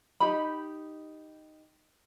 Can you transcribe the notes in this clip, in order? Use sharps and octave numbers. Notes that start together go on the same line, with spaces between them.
D#4 G4 B5